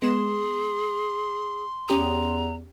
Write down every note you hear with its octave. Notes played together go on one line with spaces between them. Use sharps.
G#3 B3 G#4 C6 E7
E2 C#4 G4 A#5 D#6